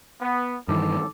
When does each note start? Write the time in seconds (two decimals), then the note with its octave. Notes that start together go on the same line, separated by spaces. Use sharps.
0.21 B3
0.68 G2 D#3 E3 A4 D6